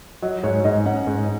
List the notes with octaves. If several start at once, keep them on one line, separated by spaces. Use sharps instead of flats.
F#3 D#5
G#2 C#5
G#2 D#5
C#4 F#5
G#2